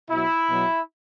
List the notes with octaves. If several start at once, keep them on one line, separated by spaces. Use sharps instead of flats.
B2 F#3 E4
B2 F#3